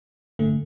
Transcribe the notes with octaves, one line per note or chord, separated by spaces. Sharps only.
A1 G2 D3 A3